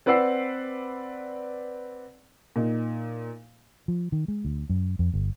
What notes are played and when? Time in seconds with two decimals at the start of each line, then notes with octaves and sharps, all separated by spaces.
0.06 C4 B4 D5 F#5 E6 C7
2.56 A#2 D#4
3.88 F3
4.12 D#3
4.28 G#3
4.45 D2
4.69 F#2
4.99 F2
5.14 G1